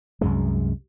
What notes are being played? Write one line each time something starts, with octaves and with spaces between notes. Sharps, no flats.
C2 F#2 G#3